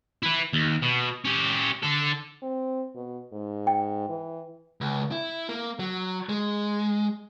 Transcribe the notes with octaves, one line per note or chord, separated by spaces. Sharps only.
E4 B4
D#2
B2
C#4 G4
D3 A4
C4
B2
G#2
G5
E3
C#2
E4
A#3
F#3
G#3